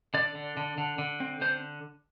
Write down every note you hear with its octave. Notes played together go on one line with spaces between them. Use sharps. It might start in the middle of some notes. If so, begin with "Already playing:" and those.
D3 D5
D3
D3
D3
D3
C4
D3 C5